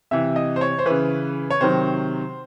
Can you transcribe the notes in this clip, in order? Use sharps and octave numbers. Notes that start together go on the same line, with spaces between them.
C3 E3 E5
D#5
C5
C#5
C5
C#3 E3 B4
C#5
C3 D#3 F#3 C5